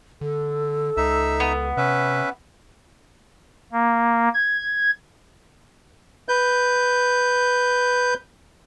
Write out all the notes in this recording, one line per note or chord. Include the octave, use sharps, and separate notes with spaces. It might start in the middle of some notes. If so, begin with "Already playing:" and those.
D3 A4
C#2 D#4 E5 E6
B3
C3 C#4 B4 E5
A#3
G#6
B4 G6